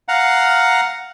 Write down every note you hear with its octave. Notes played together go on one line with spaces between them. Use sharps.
F5 F#5 A#5